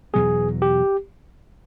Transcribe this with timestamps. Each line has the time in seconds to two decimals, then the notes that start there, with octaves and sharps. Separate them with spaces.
0.13 E2 B2 F#3 B3 G#4
0.62 G4